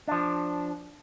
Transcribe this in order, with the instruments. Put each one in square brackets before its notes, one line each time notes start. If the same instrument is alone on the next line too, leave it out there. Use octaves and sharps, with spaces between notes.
[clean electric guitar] F3 D4